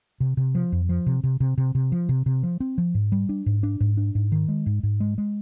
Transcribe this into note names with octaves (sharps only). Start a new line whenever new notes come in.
C3
C3
F3
F2
F3
C3
C3
C3
C3
C3
F3
C3
C3
F3
C4
F3
G#2
G3
D4
G#2
D4
G#2
D4
G#2
D#3
G#3
G#2
G#2
G#3
G#3